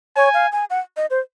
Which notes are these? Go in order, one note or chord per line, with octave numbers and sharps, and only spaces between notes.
C#5 G#5
F5
G#5
F#5
D#5
C5